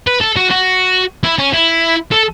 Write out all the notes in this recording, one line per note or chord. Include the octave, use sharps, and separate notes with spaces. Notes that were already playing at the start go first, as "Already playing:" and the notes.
B4
A4
F#4
F#4
E4
C#4
E4
A4